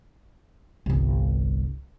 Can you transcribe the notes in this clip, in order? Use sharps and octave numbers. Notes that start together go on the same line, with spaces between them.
G1 C2